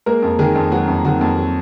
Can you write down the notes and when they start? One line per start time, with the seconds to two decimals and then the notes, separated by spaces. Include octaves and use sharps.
0.06 G#3 A#3 A#4
0.23 F2
0.39 D#3 G#3 G#4
0.56 F2
0.72 F#3 G#3 F#4
0.88 F2
1.05 D#3 F#3 F#4
1.21 F2
1.38 F#3